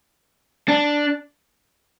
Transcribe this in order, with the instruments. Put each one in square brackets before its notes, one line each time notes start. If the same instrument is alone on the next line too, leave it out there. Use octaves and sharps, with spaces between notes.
[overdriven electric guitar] D4